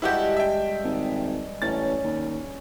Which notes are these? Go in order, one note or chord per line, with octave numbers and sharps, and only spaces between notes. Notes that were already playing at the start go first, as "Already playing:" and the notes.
G2 G#3 E4 F#4 G4 A5
E5 G5
G#1
A1 C#4 A6
D#2